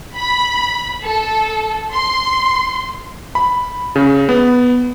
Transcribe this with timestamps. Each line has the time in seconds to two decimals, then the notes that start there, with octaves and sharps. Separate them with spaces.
0.14 B5
1.03 A4
1.93 C6
3.35 B5
3.96 C#3
4.29 B3